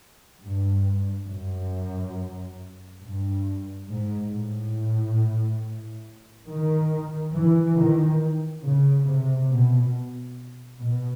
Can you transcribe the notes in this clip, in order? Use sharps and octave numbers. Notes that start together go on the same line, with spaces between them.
G2
F#2
G2
G#2
A2
D#3
E3
D#3
C#3
C3
B2
B2